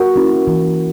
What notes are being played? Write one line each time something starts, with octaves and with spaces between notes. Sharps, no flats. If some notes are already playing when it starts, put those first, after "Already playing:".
Already playing: F#4 A#4
A#3 C#4 E4
E3